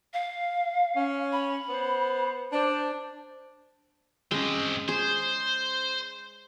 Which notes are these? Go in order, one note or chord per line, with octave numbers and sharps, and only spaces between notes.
F5
C#4
B5
B3 C5
D4 C5
G#3 C4 C#4 D#5
G#4 C5